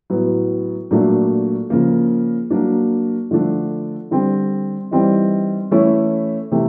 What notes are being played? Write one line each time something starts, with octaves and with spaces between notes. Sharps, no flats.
A2 F#3 B3
A#2 F#3 A3 D4
C#3 F3 A#3
F#3 A#3 D4
D3 F3 A3 D4
D3 G3 C4
E3 G3 C4 D#4
E3 A3 C#4 E4
C3 E3 A3